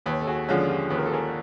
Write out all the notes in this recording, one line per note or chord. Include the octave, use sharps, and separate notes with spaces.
D#2 B4 C#5
A4
F#4 G#4
D3 F3 G#3 C#4
F4 G4
D#2 B4
A#4
A4
G#4 A#4